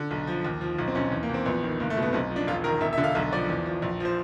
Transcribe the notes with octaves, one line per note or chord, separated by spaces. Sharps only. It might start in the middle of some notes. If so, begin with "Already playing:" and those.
Already playing: D3
B1
F3
D#2
F3
B1
C4
B1 C#4
E2
A#3
E2 C4
A#1 B3
D#3
F#1 A#3
A3
B2
B3
B1 C4
F3
D4
E1 F4
D#3 A#4
E1 E5
E5
D3
F5
B1 E5
F3 D5
E2
F3
A#1
F3 C5